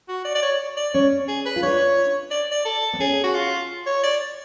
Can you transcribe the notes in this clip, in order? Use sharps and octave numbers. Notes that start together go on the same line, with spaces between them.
F#4
D5
D5
C#5
D5
C#4 C#5
G#4
B4
F4
D4 C#5
D5
D5
A4
B3
C#4 G#4
F#4
F4
C#5
D5